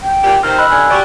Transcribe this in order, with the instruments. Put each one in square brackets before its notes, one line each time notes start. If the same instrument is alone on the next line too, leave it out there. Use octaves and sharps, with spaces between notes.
[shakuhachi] G5
[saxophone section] A#2 G4
[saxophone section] C3 D#3 C4 [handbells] F6
[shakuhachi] D#5 [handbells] B5 E6 F#6
[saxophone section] G2 D3 [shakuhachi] G#5 [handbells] F#6
[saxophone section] G3 F#4 G4 [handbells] D5